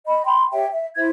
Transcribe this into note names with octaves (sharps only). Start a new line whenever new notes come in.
D#5 B5
G5 B5 C6
G4 C#5 E5 G5
E5
E4 C5 E5 G#6